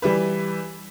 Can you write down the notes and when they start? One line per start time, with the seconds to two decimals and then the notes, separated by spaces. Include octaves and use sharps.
0.02 E3 G3 E4 B4